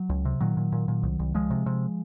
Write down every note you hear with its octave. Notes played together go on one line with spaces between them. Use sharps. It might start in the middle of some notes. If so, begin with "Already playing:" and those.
Already playing: F#3
C#2
C3
A#2 D#3 F#3
A#2
A#2
A#2
C2
C2
C#2 F3 G#3
C3
C3